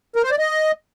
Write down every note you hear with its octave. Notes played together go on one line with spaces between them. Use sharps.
A#4
C5
D5
D#5